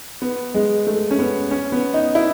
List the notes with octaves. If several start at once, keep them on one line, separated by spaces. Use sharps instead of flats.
B3
G#3
A3
C#4
B3
C#4
B3
D#4
E4